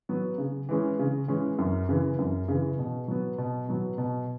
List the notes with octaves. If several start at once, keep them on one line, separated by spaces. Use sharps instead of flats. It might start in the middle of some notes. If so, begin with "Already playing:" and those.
F#3 B3
C#3
E3 G#3 C#4
C#3
E3 G#3 C#4
F#2
C#3 E3
F#2
C#3 E3
B2
F#3 B3
B2
F#3 B3
B2